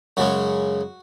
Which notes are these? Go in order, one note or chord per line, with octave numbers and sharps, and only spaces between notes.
F#2 C#3 G#3 C#4 F#4